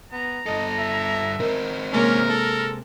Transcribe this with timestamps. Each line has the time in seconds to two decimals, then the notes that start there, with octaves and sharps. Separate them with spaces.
0.12 B3 A#5
0.46 G2 A4 D#5
0.79 E5
1.40 C4 D#4 A#4
1.93 C3 G#3 A#3 C#4 A#4
2.29 A4